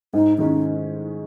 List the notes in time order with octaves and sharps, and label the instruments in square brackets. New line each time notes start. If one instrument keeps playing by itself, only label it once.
[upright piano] G#2 [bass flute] D#4
[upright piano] D#3 G#3 C#4 [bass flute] D#4